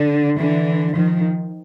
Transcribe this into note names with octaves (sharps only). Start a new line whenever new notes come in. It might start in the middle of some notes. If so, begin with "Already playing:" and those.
Already playing: D3
D3 E3
D#3 F3